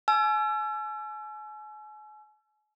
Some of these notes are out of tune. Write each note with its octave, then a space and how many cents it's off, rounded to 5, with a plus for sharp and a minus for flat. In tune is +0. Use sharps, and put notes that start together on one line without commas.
G#5 +40 E6 +35